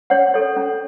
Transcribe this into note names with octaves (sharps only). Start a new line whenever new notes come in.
C#4 C#5 F#5
A4 C#5
C#4